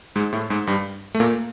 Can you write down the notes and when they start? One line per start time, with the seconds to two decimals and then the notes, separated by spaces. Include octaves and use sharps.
0.16 G#2 G#3
0.33 A2 A3
0.50 G#2 G#3
0.67 G2 G3
1.15 A3
1.20 A#2 A#3